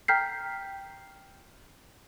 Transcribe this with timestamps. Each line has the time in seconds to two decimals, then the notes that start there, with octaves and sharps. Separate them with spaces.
0.08 G5 A#5 F6 G6 B6 C7